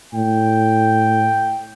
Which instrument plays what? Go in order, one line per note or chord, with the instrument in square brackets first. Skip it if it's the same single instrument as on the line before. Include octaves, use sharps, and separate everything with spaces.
[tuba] A2 [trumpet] G5